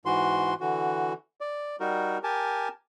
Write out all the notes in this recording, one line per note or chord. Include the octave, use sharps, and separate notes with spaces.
G#2 E3 F#4 C6
D3 E3 F#4
D5
G3 D#4 F#4 A#4
G4 A#4 G#5 A5